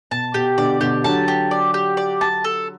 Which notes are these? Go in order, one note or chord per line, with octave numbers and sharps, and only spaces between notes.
B2 A5
B2 G4
B2 D3 D5
B2 D3 G4
D3 F#3 A5
G4
D5
G4
D5
A5
A4